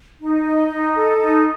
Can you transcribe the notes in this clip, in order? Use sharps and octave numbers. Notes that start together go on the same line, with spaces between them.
D#4
D#5
D#4
A4
D#4